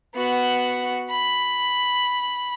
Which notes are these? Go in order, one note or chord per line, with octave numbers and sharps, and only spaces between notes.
B3 F#4
B5